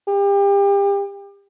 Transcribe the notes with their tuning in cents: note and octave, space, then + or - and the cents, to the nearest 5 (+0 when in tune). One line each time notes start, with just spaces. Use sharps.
G4 +30